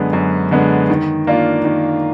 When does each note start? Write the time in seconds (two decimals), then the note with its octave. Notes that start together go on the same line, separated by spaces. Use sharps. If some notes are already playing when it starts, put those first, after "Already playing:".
Already playing: F#2 D3 G#3 B3
0.13 F#2
0.51 D3 G#3 B3
0.90 D#3
1.27 A#3 D4 F4
1.65 D#3